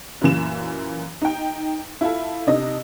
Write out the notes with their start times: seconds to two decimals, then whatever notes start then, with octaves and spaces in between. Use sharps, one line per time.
0.21 F#2 A#2 E3 E7
1.22 D#4 G5
2.01 E4 F4 A4
2.47 C3 D4 D#4 D#5